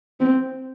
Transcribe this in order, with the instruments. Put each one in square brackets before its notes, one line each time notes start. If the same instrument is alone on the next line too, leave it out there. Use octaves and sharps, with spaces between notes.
[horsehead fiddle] C4